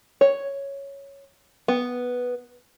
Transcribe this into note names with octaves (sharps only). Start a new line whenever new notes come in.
C#5
B3